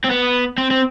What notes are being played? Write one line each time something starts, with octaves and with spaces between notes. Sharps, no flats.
C4
B3
C4
C4